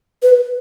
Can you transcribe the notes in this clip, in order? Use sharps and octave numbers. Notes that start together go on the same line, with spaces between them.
B4